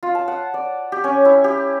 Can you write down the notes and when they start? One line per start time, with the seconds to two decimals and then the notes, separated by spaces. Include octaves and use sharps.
0.03 F4
0.15 A5
0.28 F#5
0.54 D5
0.92 G4
1.04 C#4
1.25 E4
1.44 G4